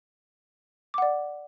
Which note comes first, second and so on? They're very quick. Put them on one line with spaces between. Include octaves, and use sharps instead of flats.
D6 F#5 D5